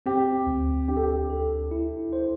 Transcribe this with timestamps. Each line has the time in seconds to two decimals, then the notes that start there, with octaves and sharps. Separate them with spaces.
0.06 C4 G4
0.47 D2
0.88 D4 G4
0.96 A4
1.03 G4
1.30 A4
1.71 E4
2.13 C5